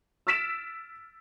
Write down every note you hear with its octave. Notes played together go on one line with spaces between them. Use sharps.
E6 F6 A6 B6 D7 E7